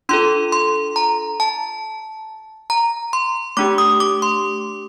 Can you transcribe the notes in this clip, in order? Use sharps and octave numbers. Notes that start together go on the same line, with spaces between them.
D4 F4 A4 C6
C6
A#5
A5
A#5
C6
A3 D4 G4 D6
D#6
D6
C6